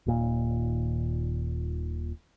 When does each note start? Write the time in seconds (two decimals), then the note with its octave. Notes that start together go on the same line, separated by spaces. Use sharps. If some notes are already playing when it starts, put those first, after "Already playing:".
0.06 D#1 D#2 A#2